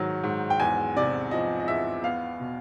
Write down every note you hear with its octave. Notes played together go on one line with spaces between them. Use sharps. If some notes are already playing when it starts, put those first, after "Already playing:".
Already playing: G#2 D#3 F#3
G#2
G5
E2 G#5
C3 D5
F3 D#5
D#5
E2 E5
B3 F5
B2